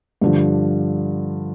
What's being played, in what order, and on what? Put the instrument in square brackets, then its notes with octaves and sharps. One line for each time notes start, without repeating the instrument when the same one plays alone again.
[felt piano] G2 D3 F3